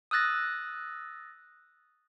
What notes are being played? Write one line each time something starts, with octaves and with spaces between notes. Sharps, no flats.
D#6 E6 F#6 A6 A#6